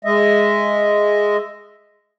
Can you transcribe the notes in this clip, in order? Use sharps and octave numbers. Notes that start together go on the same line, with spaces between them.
G#3 D#5 E5